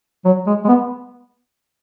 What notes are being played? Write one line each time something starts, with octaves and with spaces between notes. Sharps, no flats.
F#3
G#3
G#3
B3